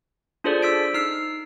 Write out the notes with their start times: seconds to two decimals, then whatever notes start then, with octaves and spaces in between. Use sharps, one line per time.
0.44 D4 F4 G#4 A4 C5 D5
0.62 E6 B6 D7
0.94 D#4 E6 F6 C7